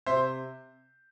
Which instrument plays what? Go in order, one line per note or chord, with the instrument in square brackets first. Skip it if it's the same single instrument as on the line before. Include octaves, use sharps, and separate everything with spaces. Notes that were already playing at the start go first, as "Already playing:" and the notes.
[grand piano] C3 C5 E5